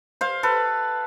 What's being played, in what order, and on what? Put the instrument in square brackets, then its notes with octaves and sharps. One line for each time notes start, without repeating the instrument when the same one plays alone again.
[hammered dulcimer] C5 F5
A4 B4